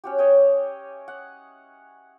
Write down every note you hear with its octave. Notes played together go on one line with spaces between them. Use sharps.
C#4 F#4 G4
C#5 D#5 E5 G5
F#5